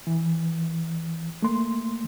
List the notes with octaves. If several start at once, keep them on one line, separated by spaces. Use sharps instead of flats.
E3
A3 A#3 C6